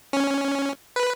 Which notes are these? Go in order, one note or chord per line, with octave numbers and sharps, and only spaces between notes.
C#4
B4